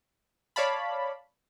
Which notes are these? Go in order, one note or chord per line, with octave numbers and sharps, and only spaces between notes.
C#5 D5 F5 A5 B5